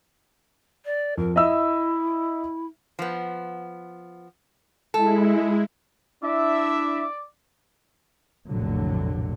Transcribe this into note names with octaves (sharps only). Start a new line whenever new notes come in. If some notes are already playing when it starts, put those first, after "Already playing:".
D5
F2 A#4
E4 D#5 E5 E6
F3 B3
G#3 E4 A4
D4 E4 D5 E5
F1 A#1 A2 D3 F#3